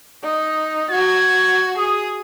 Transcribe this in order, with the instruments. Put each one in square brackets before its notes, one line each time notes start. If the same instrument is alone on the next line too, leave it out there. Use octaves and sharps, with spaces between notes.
[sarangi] D#4
[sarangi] F#4 [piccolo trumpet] G#6
[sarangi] G#4 [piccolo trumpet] D#6